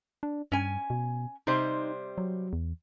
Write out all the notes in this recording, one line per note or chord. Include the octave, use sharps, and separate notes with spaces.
D4
G2 C#4 G#5
B2
C3 G3 D#4 C5
F#3
E2